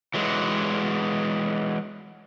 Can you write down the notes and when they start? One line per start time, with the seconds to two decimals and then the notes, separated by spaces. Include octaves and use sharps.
0.14 E3 F#3 G#3